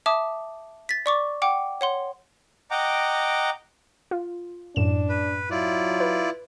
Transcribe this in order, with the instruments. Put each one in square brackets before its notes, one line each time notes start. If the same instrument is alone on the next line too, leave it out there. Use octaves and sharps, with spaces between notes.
[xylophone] E5 A5 D6 D#6
A6 B6
D5 C#6 D6
F#5 G5 D6
C#5 F#5 C6
[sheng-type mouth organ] D#5 F#5 G5 A#5 D6
[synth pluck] F4
[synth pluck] F#2 A2 E7 [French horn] D4
[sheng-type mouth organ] B4
[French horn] F#3 [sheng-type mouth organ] E4 F4 D5
[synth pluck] B4